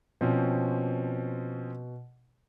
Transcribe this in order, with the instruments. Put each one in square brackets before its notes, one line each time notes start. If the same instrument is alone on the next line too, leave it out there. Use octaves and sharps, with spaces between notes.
[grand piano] B2 [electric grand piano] F3 C4 C#4